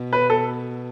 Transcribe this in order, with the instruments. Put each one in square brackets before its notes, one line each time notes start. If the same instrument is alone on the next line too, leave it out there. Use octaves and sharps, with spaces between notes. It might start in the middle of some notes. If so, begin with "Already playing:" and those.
Already playing: [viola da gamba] B2
[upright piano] B4
A4